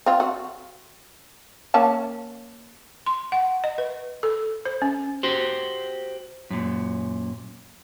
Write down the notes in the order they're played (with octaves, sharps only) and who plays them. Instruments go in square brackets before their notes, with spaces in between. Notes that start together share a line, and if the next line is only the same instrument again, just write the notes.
[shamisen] C4 F4
F#4
A#3 C#4 A5
[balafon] C6
F#5
D#5
B4
A4
C5
C#4
[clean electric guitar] F#4 G4 C5
F#2 A#2